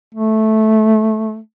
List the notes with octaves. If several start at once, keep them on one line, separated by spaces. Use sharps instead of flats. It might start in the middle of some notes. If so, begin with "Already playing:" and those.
A3